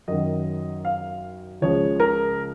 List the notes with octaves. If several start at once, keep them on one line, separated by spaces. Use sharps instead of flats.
F#2 D#3 F#3 D#5
F5
C#2 C#3 F3 G#3 C#5
A#4